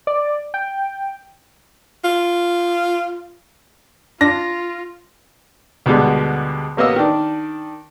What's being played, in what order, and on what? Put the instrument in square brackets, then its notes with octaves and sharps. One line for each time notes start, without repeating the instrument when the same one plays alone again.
[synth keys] D5
G5
[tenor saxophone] F4
[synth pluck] D4 [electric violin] F4 [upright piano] A#6
[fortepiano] D2 B2 D3 G3 G#3
A1 A#3 B3 D#5 E6
D#3 D4